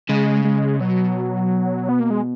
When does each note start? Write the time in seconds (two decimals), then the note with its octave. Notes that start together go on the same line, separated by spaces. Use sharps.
0.09 C#3 G#3
0.45 G#3
0.80 B2 F#3
1.89 B3
2.00 A#3
2.10 G#3